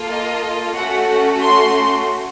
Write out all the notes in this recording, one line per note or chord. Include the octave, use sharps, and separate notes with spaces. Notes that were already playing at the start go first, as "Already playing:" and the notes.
Already playing: A#3 F4 A4
D#5
A3 C#4 F#4 A4 F#5
C6